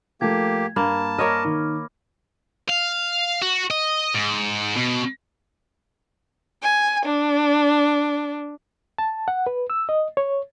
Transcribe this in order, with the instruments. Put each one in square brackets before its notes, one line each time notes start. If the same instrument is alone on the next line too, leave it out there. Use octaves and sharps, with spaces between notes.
[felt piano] F3 A3 A4 [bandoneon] A#3 G4 [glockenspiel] G#6
[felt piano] G2 [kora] A#3 [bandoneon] A5 [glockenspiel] B5
[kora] A#4 C#5 D#5 [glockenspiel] D6 F6
[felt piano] D#3
[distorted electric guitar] F5
F#4
D#5
G#2
B2
[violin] G#5
D4
[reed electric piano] A5
F#5
B4
E6
D#5
C#5